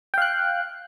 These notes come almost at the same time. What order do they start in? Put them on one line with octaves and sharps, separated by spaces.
G5 F5 F#6